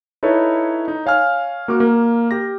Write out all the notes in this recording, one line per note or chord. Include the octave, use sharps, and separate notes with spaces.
D#4 E4 A4 B4 C#5
D#4
C#5 F5 G#5 F6
A#3 F#4 D6 F6
A#3
G4 A#6